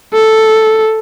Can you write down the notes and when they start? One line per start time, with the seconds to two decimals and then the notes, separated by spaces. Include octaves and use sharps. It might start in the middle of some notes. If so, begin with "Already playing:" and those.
0.14 A4